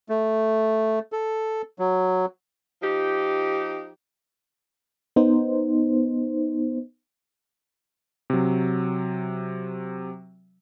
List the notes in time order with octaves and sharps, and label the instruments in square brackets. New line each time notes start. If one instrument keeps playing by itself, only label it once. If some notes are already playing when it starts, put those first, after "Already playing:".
[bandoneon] A3
A4
F#3
[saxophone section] F3 D#4 G4
[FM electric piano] B3 D#4 C5
[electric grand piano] C3 F#3